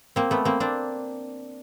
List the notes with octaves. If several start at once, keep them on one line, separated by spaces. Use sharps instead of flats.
A#3 C4
A3 B3
A#3 C4
C4 D4